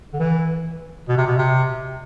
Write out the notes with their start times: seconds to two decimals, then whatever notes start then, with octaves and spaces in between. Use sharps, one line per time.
0.14 D3
0.20 E3
1.08 B2
1.17 C3
1.27 B2
1.38 C3